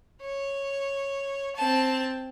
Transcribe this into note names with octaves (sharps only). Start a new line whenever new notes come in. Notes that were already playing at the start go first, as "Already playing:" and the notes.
C#5
C4 A5